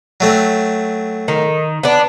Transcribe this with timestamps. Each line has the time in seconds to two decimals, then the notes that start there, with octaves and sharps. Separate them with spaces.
0.20 F#3 A3 C4
1.28 D#3
1.83 B3 D4